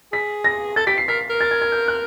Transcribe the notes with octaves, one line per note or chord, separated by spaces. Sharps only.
G#4 B6
A#6
A4 A6
G4 B6
C7
A#4 B6
A#4
A6
G#6
G#6
G6
F#6